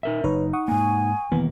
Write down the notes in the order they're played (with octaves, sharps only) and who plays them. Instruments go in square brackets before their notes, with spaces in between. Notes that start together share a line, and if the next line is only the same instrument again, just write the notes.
[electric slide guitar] D#4 A#4 E5
[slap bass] F#1 [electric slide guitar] D#4 [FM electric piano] B4 C#5
[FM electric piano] F#5 C#6 D#6
[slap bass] G#2 A#3 [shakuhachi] G#5
[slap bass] E1 D#3 A#3 [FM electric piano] E3 B3